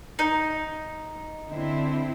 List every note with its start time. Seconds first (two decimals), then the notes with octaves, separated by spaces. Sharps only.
0.19 D#4
1.49 D3 C4 E4